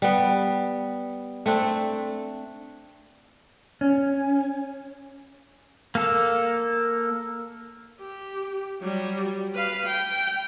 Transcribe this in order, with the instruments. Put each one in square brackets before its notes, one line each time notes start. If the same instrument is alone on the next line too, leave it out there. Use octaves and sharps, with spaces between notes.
[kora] G3 B3
A3 C4 D4
[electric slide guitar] C#4
[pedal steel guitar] A#3 A4
[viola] G4
F#3 G3
B4 F5
G5